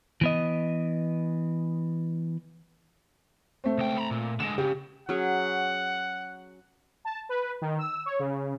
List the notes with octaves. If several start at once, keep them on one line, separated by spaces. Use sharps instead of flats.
E3 B3 D#5
A3 C4
C#2 G5
A#5 B5
A#2
D3 G#3 E7
C#3 G4
F#3 C#4 G#4 F#5
A5
B4
D#3
E6
C#5
C#3